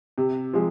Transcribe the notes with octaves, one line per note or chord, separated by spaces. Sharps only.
C3
F3 G#3